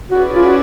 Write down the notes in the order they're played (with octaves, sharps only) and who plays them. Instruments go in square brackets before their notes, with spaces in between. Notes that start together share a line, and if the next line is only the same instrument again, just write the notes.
[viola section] C#4 E4 G#4 B4 D5 [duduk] F#4
[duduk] F4
F#4